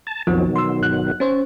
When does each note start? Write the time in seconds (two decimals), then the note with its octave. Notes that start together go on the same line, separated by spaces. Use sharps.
0.07 A5
0.27 B1 F2 B2 D#3 F3 F#3
0.56 C6 E6
0.80 G1 F#6
1.20 C#4 C5 C#5